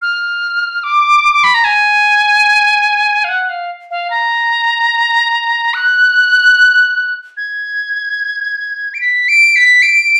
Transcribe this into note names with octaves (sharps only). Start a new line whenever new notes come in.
F6
D6
D6
B5
A#5
G#5
F5
F#5
F5
F5
A#5
F#6
G#6
D7
B6
D7
B6
D7